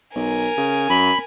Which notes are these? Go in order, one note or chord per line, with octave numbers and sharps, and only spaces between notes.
B1 A#4 G#5
C#3
F#2 B5